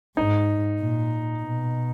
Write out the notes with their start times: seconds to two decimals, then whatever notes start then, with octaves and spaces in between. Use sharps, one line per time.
0.17 G#2 D#4
0.79 A#2
1.43 B2